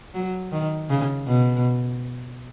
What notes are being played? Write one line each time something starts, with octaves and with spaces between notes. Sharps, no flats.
F#3
D#3
C#3
B2